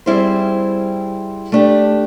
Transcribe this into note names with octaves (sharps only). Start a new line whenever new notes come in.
G3 C4 E4 G#4 C5
A3 D4 G4